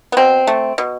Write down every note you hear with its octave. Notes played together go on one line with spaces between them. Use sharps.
B3
B2 C4
A3
B2